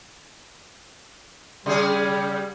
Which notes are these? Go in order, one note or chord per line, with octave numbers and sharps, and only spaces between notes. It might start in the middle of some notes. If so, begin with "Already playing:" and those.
C#3 G3 G#4